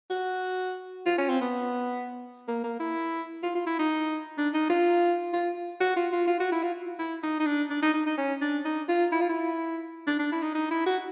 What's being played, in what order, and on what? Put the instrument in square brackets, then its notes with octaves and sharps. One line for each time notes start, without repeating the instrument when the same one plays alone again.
[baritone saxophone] F#4
F4
C#4
C4
B3
A#3
A#3
E4
F4
F4
E4
D#4
D4
D#4
F4
F4
F#4
F4
F4
F4
F#4
E4
F4
E4
D#4
D#4
D4
D4
D#4
D#4
D#4
C#4
D4
D#4
F4
E4
F4
E4
D4
D4
E4
D#4
D#4
E4
F#4